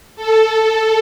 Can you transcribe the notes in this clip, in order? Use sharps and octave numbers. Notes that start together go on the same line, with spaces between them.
A4